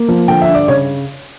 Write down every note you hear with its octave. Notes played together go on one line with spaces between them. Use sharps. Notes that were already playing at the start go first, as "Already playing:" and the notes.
Already playing: A#3
F3
D3 G5
E5
G2
D5
C#3 C#5